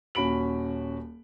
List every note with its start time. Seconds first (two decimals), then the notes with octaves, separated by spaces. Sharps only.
0.15 D#1 C#4 F#4 B5 D7 F#7